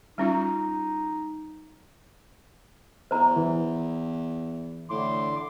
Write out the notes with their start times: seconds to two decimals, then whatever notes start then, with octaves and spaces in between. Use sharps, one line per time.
0.18 G3 C#4 D#4 F4
3.11 E2 C5 A#5
3.36 E3
4.90 A2 D3 C6 D6